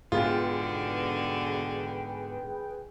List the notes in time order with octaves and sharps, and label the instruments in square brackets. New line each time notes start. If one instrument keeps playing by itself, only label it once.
[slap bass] G#2 B3 [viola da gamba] B2 D3 [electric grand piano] F4 [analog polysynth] G#4 B4 G5